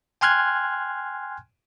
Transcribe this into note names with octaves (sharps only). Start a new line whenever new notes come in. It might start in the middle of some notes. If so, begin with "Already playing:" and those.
G5 G#5 C6 F6 F#6 G#6